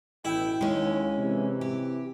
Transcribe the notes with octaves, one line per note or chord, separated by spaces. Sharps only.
A1 B2 E4 G5
D#2 G#3 C#4
C3 E3
G4